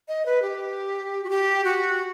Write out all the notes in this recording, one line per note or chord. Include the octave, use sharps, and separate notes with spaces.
D#5
B4
G4
F#4
G4
F#4